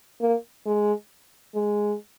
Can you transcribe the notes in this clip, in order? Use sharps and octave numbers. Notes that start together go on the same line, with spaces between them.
A#3
G#3
G#3